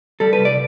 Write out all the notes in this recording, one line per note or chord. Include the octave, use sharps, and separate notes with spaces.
G3 A4
B4
C2
D5